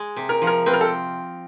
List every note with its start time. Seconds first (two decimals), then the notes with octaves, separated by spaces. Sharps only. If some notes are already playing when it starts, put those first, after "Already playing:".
Already playing: G#3
0.17 C3
0.29 A#4
0.42 F3
0.47 A#4
0.66 C4 B4
0.73 A#4
0.81 A4